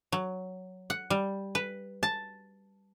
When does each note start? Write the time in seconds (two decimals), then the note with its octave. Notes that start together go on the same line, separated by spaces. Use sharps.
0.12 F#3
0.90 F#5
1.10 G3
1.55 B4
2.03 A5